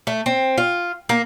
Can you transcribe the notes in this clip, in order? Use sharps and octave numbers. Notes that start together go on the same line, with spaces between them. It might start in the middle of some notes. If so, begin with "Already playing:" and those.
A3
C4
F4
A#3